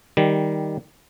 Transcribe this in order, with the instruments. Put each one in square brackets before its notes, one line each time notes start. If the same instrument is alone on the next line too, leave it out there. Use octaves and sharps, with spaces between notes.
[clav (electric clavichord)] D#3 G3